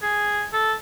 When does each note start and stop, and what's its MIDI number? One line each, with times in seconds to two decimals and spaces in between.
0.02 0.45 68
0.53 0.73 69